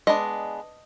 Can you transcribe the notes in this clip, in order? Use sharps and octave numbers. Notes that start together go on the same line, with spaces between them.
G#3 B3 D4 D#5